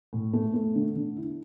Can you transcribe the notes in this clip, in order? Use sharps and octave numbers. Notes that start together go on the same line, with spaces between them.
A2
A3
A3
D3
D3
E4